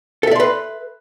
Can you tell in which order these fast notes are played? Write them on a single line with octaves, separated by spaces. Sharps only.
A4 E5 D5 C6 B4